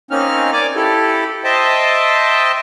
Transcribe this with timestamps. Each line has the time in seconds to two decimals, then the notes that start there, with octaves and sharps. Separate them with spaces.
0.11 A#3 C4 C#4 D#4 F6
0.53 D5 G#5 D6
0.76 E4 G4 A4
1.44 C5 D#5 E5 G5 A5